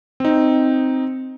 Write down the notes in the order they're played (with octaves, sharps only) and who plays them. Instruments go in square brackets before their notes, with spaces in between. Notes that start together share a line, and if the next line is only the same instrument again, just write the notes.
[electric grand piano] C4 D#4